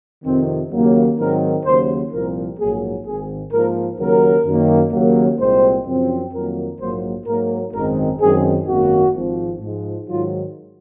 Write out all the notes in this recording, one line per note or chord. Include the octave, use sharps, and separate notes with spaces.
F2 C3 D#3 C4
D#2 C#3 F#3 A#3
G#2 D#3 F#3 C4 A#4
D#2 C#3 F#3 C5
C2 A#2 F3 C4 A#4
A#1 G#2 F#3 A#3 G#4
G#1 G#2 D#3 G#4
G#2 F3 A#3 A#4
D#2 C#3 F#3 A#4
F#2 D#3 A#3
D#2 C#3 F#3 A#3
C2 A#2 G#3 C4 C5
F#2 C#3 F3 C4
F2 D#3 F#3 A#3 A#4
A#1 G#2 F#3 A#3 C5
G#2 F#3 A#3 A#4
G#1 F#2 D#3 G#3 C4 A#4
F#2 D#3 G#3 C4 G#4
G#1 F#2 D#3 A#3 F#4
G#1 G#2 F3 C4
G#2 F3 G#3
G#2 D#3 F#3 F4